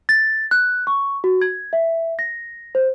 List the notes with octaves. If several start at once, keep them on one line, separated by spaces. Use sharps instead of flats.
A6
F#6
C#6
F#4
G#6
E5
A#6
C5